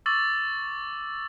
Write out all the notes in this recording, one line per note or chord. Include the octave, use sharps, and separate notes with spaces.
C#6 D6 E6 A6 F#7